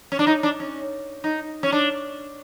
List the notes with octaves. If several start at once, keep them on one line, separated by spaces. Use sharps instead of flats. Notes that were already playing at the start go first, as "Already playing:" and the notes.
C#4
D4
D#4
D4
C#4
D#4
C#4
D4